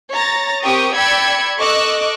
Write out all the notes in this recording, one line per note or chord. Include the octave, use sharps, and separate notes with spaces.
C#5 A#5 A6 A#6
C4 G4 A#4 G5 C#6 D#6
D5 G5 B5 E6 G#6 C#7
A4 D#5 C#6 D6 E6 F#6